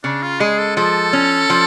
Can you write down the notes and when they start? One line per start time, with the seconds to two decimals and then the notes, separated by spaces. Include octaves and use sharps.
0.03 C#3 D4
0.22 F4
0.40 G#3 G#4
0.58 A4
0.77 F3 A4
1.13 C#4
1.50 F3